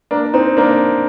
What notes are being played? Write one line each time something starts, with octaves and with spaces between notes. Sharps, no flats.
A#3 D4
C4 D#4
A#3 D4